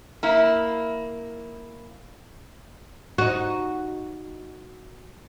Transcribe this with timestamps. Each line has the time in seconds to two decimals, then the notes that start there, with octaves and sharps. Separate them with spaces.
0.23 A#3 E4
3.18 D#4 F#4